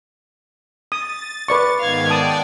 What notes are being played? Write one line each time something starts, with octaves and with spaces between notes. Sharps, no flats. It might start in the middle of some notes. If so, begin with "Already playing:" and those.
D#6 A6
B4 D5 C#6
G#2 D#3 B3 F5 G#6
D5 F#5 G5 A5 D#6